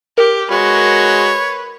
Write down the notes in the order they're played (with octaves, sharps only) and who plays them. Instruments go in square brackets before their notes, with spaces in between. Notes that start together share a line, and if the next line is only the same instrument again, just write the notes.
[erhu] G4 [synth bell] A#4
[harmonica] G#3 F#4 [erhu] B4 [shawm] C#5